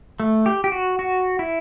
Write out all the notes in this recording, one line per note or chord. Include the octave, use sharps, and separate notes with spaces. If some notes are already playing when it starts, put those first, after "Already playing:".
A3
G4
G4
F#4
F#4
E4